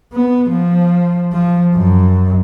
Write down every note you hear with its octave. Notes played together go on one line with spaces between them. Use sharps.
B3
F3
F3
F#2